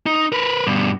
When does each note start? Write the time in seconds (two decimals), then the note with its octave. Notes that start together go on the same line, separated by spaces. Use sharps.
0.06 D#4
0.32 A#4 B4
0.67 G2 B2